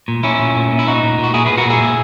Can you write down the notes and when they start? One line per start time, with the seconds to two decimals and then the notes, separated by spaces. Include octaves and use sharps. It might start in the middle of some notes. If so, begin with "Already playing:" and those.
0.08 A#2
0.23 A#2 C#4 E4
0.39 A#2
0.56 A#2
0.72 A#2
0.79 E4
0.87 A#2 D#4 F#4
1.03 A#2
1.19 A#2
1.24 F#4
1.34 A#2 E4 G#4
1.46 A#2 G#4 B4
1.58 F#4 A#4
1.66 A#2 E4 G#4
1.81 A#2